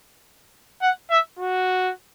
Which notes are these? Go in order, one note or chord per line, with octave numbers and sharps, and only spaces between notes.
F#5
E5
F#4